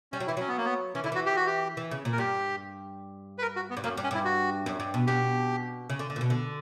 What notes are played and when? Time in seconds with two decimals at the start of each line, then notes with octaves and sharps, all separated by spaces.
0.12 G3 C#4
0.20 F#3
0.27 E3 E4
0.37 F#3 C#4
0.48 B3
0.57 A#3
0.65 B3
0.95 E3 C#4
1.04 D3 E4
1.12 E3 F#4
1.26 G4
1.36 F#4
1.46 G4
1.77 E3
1.91 C#3
2.05 A#2
2.12 A#4
2.18 G2 G4
3.38 B4
3.42 A#4
3.56 F#4
3.70 B3
3.77 G2
3.84 F#2 A#3
3.97 G2
4.04 C#4
4.11 G2 E4
4.25 F#4
4.66 F#2
4.80 G2
4.94 B2
5.07 B2 G4
5.90 C#3
5.99 D3
6.10 D3
6.16 A#2
6.21 B2
6.30 D3